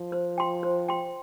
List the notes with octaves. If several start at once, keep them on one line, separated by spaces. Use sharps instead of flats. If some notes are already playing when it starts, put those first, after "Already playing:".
Already playing: F3
C5
G5 C6
C5
G5 C6